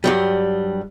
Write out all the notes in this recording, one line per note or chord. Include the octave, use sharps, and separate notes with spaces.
G2 F#3 G3